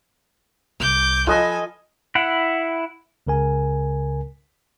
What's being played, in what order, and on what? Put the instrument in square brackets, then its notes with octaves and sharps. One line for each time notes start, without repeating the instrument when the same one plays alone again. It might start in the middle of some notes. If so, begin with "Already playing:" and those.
[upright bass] C2 [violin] D6 G6
[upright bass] F3 [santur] F4 B4 D#5 [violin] A4 G#5
[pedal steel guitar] E4 F#5
[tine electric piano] C#2 C#3 A#4 G#5